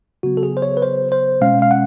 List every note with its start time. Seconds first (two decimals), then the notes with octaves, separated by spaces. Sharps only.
0.23 C#3 F#3 B3 F#4
0.37 A4
0.43 G#4
0.57 C5
0.62 C#5
0.77 B4
0.82 C5
1.12 C5
1.41 B2 G#3 C#4 F5
1.62 F5
1.71 F#5